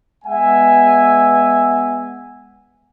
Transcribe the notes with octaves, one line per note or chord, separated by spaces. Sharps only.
G#3 B3 E5 F#5 G#5